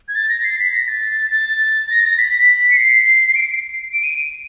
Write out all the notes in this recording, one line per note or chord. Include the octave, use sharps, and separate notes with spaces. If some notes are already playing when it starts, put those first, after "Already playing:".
G#6
A6
A#6
C7
B6
A#6
A6
A6
A#6
A#6
B6
C#7
C7
D7
D7
D#7